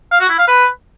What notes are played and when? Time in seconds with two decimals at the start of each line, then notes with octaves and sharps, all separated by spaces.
0.11 F5
0.21 F#4
0.30 E4
0.39 F5
0.48 B4